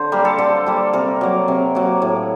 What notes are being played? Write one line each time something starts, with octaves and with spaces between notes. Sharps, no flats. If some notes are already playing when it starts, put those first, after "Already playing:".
Already playing: D3 C5
G3 A#3 A#4
A4
D3 A4
G3 A#3
C3 A#4
F#3 A#3
C3
F#3 A#3
A2